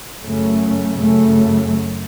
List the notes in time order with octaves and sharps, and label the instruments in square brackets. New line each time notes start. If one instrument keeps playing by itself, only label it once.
[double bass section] F#2 C#3 A3
F#2 C#3 A3